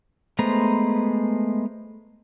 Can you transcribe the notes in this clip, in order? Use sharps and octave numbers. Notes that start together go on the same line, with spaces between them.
G#3 A3 B3 C5 A#5